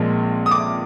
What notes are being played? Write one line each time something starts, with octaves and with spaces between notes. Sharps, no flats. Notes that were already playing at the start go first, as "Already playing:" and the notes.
Already playing: A#1 A#2 F3 G#3 C4
D#6
D6